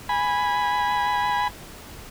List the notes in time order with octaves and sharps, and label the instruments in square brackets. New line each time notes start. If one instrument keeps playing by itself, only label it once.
[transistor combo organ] G#5 B5